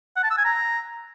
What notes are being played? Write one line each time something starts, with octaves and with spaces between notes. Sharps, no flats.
F#5
A5
E6
G#5
A#5